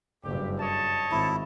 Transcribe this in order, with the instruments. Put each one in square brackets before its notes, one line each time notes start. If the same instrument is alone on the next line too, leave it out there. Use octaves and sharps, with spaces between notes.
[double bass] F#1 G2 [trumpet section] G4
[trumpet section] C#5 D#5 A5
[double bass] G#1 [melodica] E4